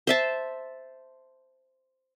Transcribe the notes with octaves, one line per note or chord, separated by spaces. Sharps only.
C5 E5 A5